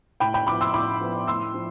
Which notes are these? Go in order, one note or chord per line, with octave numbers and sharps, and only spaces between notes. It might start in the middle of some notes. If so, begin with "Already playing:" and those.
A2 G5 B5
G5 B5
F3 B3 E4 B5 D6
C6 E6
A2 B5 D6
F3 B3 E4
A2 C6 E6
F3